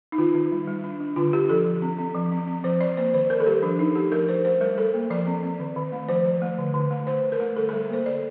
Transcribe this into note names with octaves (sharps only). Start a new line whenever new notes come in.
D#4
D#3 F4
D#3
G3
G3
D4
D4
D3 F4
D4 G4
F3 A4
F3
C4
C4
F3
C4
C4
F3 C5
F3 D5
A#3 C5
D#3 C5
D#3 A#4
A4
G3 G4
F3 D4
F3 D#4
A3 G4
F3 A#4
F3 C5
A3 C5
G3 A#4
G3 A4
A#3
F3 D5
C4
C4
D#3
D#3
A3
F3 C5
F3
A3
D3
D3
A3
D3 C5
D3
A#4
A3
G3 A4
A4
G3
A4
A#3 C5
D3 D5